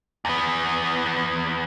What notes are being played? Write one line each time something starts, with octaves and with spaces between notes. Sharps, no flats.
E2 B3